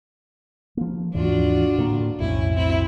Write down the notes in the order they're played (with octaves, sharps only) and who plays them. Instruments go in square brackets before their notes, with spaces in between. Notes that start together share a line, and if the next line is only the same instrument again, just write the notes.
[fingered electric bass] F3 A#3
[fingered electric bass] D#2 G#2 E3 [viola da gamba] D4 F4 F#4
[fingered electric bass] A2 D3 A#3
[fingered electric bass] B1 F2 A2 [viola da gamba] C#4 E4
[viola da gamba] C4 E4